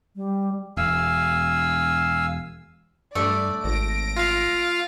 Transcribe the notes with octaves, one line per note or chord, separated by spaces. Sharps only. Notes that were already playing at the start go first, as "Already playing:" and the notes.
G3
E1 F5 G#5 E6
G2 A3 D5
G#1 A#6 D7
F4 F5